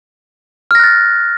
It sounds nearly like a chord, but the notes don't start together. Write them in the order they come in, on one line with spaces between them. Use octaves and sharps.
F6 A#6 F#6 A6